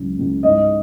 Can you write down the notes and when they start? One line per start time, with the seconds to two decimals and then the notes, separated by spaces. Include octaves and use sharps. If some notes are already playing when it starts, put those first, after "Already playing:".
Already playing: C#2 F#3
0.18 C#2
0.43 G#2 D#5